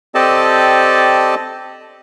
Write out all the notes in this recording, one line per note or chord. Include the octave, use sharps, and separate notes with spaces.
C4 G4 A4 D5 D#5 A5